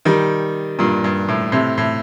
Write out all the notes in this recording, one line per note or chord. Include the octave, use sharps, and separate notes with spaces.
D#3 G3
G2 A#2
G2
A2
A2 C3
A2